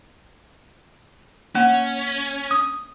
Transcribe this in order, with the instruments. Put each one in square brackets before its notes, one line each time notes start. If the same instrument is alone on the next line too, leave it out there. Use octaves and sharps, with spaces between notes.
[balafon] A#3 F#5 [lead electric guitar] C#4
[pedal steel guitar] D#6